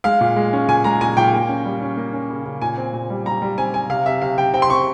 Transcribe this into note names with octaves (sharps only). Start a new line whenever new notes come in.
G#3 F5
A#2
G#3
C#4
A#2 G#5
G#3 A#5
A#2 G#5
A#2 G5
A#3
C#4
G3
C#4
A#3
C#4
C#3
C#3
A#2 G#5
C4
A#2
G3
G3 A#5
G3
C4 G#5
C4 G#5
C3 F5
C3 E5
C3 F5
C3 G5
C4 G5
C6
C4 C#6